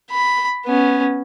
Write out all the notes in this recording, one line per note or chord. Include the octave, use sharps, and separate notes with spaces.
B5
B3 C#4